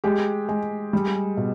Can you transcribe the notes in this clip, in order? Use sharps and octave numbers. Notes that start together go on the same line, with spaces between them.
G#3 G4
G#3
G3
B2